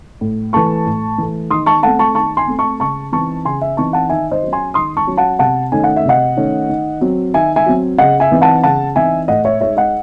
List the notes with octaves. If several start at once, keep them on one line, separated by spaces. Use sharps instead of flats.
A2
E3 A3 A5 C#6
A2
E3 A3
D#3 C6 D#6
A5 C#6
A3 C4 F#5 A5
A5 C#6
D#3 A5 C#6
G#5 C6
A3 C4
A5 C#6
C#3 A5 C#6
E3 C4 D#4 A5 C#6
C#3 G#5 C6
E5 G#5
E3 C4 D#4 A5 C#6
F#5 A5
D#3 E5 G#5
C5 D#5
F#3 C#4
G#5 C6
D#3 C6 D#6
A5 C#6
F#3 C#4
F#5 A5
C3 F#5 A5
D#3 A3 C#4 G#5
F#5
E5
C3 D#5 F#5
D#3 A3 C#4
D#3
F#3 C4
D#3 E5 G#5
E5 G#5
F#3 C4
C#3 D#5 F#5
E5 G#5
E3 C4 D#4
F#5 A5
C#3 F#5 A5
E3 C4 D#4 E5 G#5
A2 D#5 F#5
C#5 E5
G#3 D#4 C#5 E5
D#5 F#5